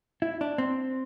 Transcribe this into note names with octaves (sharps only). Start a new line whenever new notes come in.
E4
D4
C4